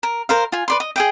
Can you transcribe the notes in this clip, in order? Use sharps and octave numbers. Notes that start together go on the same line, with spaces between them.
A#4
A#4 C5 F5
F4 G#5
B4 D5 C6
D#5
G#4 D#5 G5